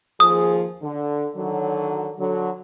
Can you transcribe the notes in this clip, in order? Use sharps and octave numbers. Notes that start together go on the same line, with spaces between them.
D#2 F3 G#4 D#6
D3
D3 D#3 F#3
D3 F#3